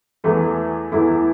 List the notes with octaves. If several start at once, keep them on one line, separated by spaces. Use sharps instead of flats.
E2 E3 A3 E4
E2 E3 A3 E4